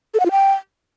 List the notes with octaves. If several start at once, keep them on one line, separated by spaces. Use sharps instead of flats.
A4
F#5
F4
G5